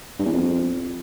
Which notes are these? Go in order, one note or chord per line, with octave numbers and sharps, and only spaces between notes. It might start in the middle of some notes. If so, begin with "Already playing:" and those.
G2
E2
F2